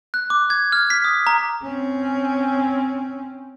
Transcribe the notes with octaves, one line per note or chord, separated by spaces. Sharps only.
F#6
D6
G#6
F6
B6
D#6
A#5
C4 C#4